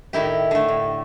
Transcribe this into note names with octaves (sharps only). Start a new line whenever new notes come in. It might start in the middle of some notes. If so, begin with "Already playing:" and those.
A2 D#3 E4 G4
D3 A3
A2